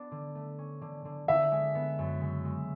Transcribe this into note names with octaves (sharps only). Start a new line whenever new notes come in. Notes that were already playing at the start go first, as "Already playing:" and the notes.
Already playing: B3 D4
D3
A3
C#4
D3
D3
D3 E5
G#3
B3
F#2
C#3
G#3